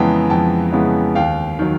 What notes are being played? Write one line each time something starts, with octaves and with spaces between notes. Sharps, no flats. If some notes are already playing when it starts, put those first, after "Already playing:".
Already playing: F2 C#3 E3 G#3 B3 G5 A5 A#5
F2 G5 A5
C#3 E3 G#3 B3
D#2 F5 G5
D#3 F#3